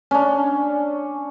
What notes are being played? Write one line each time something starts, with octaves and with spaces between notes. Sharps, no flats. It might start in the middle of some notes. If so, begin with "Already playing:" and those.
C#4 D4